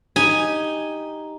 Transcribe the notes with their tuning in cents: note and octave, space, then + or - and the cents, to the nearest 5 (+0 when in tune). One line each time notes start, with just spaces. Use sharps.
D#4 +0 G4 +0 G#5 +0